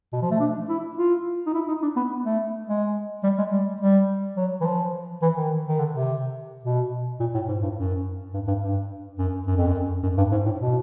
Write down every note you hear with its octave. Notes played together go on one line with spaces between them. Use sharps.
B2
F3
A3
D4
E4
F4
D#4
E4
D#4
D4
B3
A3
G#3
G3
G#3
G3
G3
F#3
E3
F3
E3
D#3
D#3
D3
C3
B2
A#2
A2
G#2
G2
F#2
G2
G2
G2
F#2
F#2
F2
F#2
F#2
G2
G#2
A2
B2